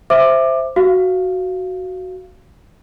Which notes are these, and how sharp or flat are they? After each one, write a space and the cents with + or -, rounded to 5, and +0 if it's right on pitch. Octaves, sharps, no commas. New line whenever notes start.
C5 +0 E5 +0 D6 +20
F#4 +0 F5 -15